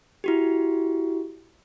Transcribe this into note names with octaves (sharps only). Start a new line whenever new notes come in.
E4 F#4 G4